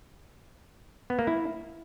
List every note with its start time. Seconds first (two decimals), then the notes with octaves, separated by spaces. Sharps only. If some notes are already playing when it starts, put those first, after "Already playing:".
1.10 B3
1.19 A#3
1.27 E4